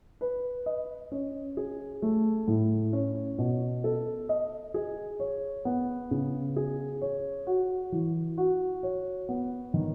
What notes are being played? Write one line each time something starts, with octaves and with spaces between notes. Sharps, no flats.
B4
D#5
C#4
G#4
A3
A2
C#4
B2
A4
D#5
G#4
C#5
B3
C#3
G#4
C#5
F#4
E3
F#4
C#5
B3
D#3